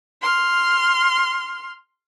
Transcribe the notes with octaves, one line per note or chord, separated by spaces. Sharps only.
C6 F6